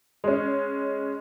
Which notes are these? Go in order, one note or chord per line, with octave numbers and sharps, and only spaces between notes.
G#3 C#4